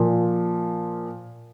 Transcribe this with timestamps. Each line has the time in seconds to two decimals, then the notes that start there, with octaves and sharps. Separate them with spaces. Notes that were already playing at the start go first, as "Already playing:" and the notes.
Already playing: A#2 F3